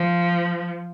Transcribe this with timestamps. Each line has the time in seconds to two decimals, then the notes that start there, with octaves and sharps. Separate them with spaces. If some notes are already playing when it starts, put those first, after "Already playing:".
Already playing: F3